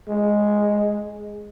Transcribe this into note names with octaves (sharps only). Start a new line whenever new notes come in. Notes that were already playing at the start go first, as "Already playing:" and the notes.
G#3